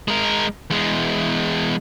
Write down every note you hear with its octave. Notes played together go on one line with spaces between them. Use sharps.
G#3 A#4
E2 G#3